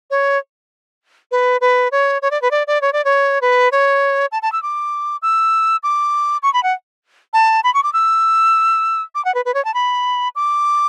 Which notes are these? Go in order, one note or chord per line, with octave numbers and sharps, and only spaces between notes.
C#5
B4
B4
C#5
C#5
D5
B4
D5
D5
C#5
D5
C#5
B4
C#5
A5
A5
E6
D6
E6
D6
C#6
B5
F#5
A5
B5
C#6
D6
E6
D6
F#5
B4
B4
C#5
A5
B5
D6